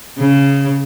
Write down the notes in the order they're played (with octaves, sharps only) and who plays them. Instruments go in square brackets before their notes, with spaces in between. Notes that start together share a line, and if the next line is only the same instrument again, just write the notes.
[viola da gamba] C#3